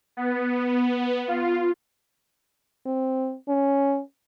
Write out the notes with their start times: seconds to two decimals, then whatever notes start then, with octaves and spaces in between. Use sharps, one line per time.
0.17 B3
1.28 F4
2.86 C4
3.48 C#4